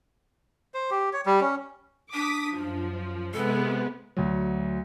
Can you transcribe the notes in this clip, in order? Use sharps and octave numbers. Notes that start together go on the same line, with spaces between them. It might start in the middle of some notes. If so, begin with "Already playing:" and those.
C5
G4
C#5
G3
C#4
D4 D6 D#6 B6
F#2 F3
C3 G#3 B3 A4
D2 F#3